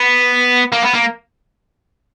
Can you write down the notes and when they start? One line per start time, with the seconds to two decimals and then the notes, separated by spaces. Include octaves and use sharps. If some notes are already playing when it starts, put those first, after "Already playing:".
Already playing: B3
0.72 A#3
0.83 B3
0.94 A#3